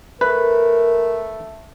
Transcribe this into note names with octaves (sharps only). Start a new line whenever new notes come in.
A3 A#4 B4